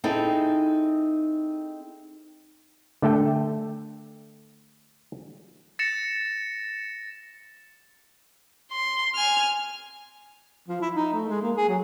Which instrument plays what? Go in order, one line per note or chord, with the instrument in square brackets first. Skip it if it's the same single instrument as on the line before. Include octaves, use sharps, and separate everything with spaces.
[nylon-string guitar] C4 D#4 E4 G#4 A4
[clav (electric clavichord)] D3 A3 A4 G5
[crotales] A6 A#6 C#7 E7
[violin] C6
G#5 F6
[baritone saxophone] F3
E4
D#4
A3
G#3
A#3
G#4
F#3